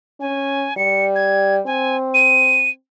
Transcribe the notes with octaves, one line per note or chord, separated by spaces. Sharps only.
C#4 G#5
G3 C#7
G#6
C4 G#5
D#7